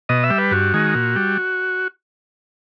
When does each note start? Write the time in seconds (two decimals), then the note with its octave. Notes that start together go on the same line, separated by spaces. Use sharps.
0.09 B2 D#5
0.23 E5
0.30 G3
0.38 B4
0.51 G2 F#4
0.74 D#3 G#3
0.95 A#2
1.16 G3